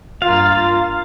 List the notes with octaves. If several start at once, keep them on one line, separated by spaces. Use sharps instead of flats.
G2 A#3 F4 F5 A6